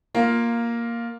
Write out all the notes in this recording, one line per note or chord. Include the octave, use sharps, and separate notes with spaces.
A#3 F4